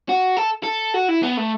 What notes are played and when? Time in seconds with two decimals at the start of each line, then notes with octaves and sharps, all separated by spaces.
0.09 F#4
0.37 A4
0.63 A4
0.94 F#4
1.09 E4
1.23 B3
1.38 A3